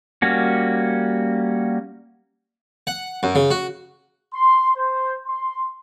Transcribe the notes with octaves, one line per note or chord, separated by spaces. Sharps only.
G3 A#3 C#4 F#4
F#5
F#2
C#3
F#4
C6
C5
C6